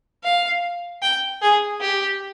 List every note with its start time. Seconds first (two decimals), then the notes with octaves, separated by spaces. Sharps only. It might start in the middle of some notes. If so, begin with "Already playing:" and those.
0.24 F5
1.02 G5
1.42 G#4
1.81 G4